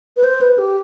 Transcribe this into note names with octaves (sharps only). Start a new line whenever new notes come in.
B4
C5
B4
G4